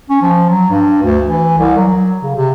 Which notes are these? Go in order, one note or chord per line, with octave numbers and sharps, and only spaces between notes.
C#4
F3
F#3
G2
D2
E3
C2
F#3
C#3
C3